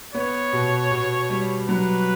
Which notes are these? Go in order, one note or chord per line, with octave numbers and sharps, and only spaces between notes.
B3 C#5
B2
B2
G3
F#3 B4